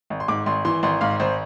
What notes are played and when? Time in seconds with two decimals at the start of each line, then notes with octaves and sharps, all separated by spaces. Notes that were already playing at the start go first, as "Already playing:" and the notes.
0.10 G#1
0.20 C6
0.28 G#2 D6
0.46 G#1 C6
0.65 E3 C6
0.83 G#1 C6
1.01 G#2 F5
1.20 G#1 C5